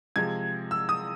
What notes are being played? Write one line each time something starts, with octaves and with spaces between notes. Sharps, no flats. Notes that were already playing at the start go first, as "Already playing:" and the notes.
C3 F3 G#3 G#6
E6
D#6